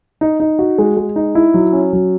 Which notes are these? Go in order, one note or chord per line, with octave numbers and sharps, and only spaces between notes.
D#4
D#4
F#4
G#3
G#3
D#4
E4
F#3
C#4
F#3